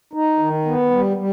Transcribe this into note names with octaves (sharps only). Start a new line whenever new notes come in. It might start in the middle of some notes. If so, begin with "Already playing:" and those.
D#4
D#3
B3
G3
G3